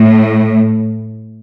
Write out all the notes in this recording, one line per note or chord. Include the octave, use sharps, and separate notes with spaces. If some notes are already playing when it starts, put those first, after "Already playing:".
Already playing: A2